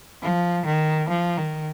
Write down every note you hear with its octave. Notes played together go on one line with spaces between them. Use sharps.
F3
D#3
F3
D#3